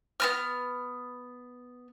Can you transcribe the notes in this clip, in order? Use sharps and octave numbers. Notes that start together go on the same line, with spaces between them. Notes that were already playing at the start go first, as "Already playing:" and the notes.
B3 C4 F6